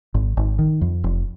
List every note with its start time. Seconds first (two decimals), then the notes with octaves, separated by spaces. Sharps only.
0.14 G#1
0.37 G#1
0.59 D#3
0.81 F2
1.04 F1